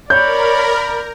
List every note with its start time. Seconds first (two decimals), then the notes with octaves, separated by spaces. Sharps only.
0.10 A#4 C#5 D5 B5 G6